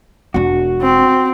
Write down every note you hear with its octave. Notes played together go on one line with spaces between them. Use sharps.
E1 D4 F#4
C4